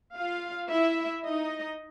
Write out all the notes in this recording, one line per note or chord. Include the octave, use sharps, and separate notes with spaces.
F4 F5
E4 E5
D#4 D#5